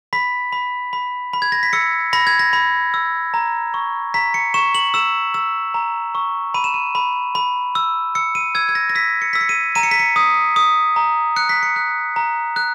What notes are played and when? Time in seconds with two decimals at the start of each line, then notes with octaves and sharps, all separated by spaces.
0.13 B5 B6
0.52 B5
0.93 B5
1.33 B5
1.42 G#6
1.52 A#6
1.63 B6
1.73 E6 C#7
2.13 B5 A#6
2.27 G#6
2.39 A#6
2.53 B5
2.94 E6
3.34 A#5
3.74 C#6
4.14 A#5 B6
4.34 C#7
4.54 C#6 E7
4.75 F#7
4.94 E6 E7
5.34 E6
5.74 A#5
6.15 C#6
6.54 B5 D#7
6.64 E7
6.74 D#7
6.95 B5
7.35 B5
7.75 E6
8.15 E6 C#7
8.35 D#7
8.55 E6 G#6
8.69 G#6
8.75 A#6
8.89 A#6
8.95 E6 B6
9.22 C#7
9.33 E6 B6
9.41 C#7
9.49 D#7
9.75 A#5 D#7
9.83 C#7
9.91 B6
9.99 C#7
10.16 D#6
10.56 D#6
10.96 A#5
11.36 F#6 C#7
11.49 B6
11.63 C#7
11.76 F#6
12.16 A#5
12.56 F#6